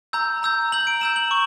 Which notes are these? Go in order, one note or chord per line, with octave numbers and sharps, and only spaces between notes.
A#5 E6 G6
A#5 E6 G6
A#5 E6 G6 F#7
D7
A#5 E6 G6 E7
F#7
C#6